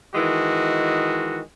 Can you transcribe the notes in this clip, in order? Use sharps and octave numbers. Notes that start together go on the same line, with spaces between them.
D#3 E3 G#3 F#4